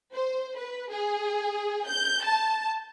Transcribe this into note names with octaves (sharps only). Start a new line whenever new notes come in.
C5
B4
G#4
G6
A5